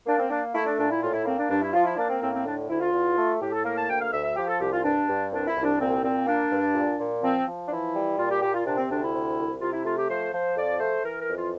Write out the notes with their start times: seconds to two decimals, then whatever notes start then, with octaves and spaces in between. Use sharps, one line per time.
0.06 A#3 D4
0.19 C4
0.30 A#3 D4
0.54 A3 E4
0.66 D4
0.78 A#2 D4
0.91 E4
1.02 A2 F4
1.14 E4
1.26 A#3 C4
1.38 D4
1.50 G2 D4
1.62 E4
1.73 F3 F4
1.85 E4
1.97 A#3 D4
2.09 C4
2.21 A2 C4
2.34 C4
2.45 D3 D4
2.69 D2 E4
2.81 F4
2.93 E2
3.17 A3
3.41 A2 G4
3.52 A4
3.64 A#3 A#4
3.76 A5
3.88 D2 G5
4.00 F5
4.12 D2 E5
4.24 E5
4.36 F3 G4
4.47 A4
4.60 C2 G4
4.71 F4
4.83 G2 D4
5.08 G2
5.32 C2 D4
5.47 E4
5.55 C2
5.64 D4
5.79 A#2 C4
6.03 A#2 C4
6.26 A#3 D4
6.51 G2
6.75 A#2
6.99 A#2
7.22 F3 C4
7.46 F3
7.66 D4
7.70 E3 E4
7.94 G3
8.17 A#2 F4
8.30 G4
8.42 A#2 G4
8.54 F4
8.65 C3 D4
8.77 C4
8.89 D2 D4
9.01 E4
9.13 C3
9.37 C2
9.61 C3 F4
9.73 E4
9.85 A3 F4
9.97 G4
10.09 F3 C5
10.33 F3 C5
10.56 F2 D5
10.80 A3 C5
11.04 E3 A#4
11.20 A#4
11.28 F2
11.36 F4